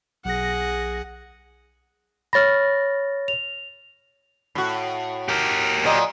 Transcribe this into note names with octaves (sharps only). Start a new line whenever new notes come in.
B1 G#4 F#5 A#6
C#5 B5 F6 A6 A#6
F7
A2 F#4
G4 A#4
A#2 F#3 D#5